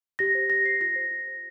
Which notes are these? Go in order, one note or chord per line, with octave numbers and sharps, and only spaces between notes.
G4 A#6
C5
G4 A#6
C5 C7
F4 A#6
C5
F4
C5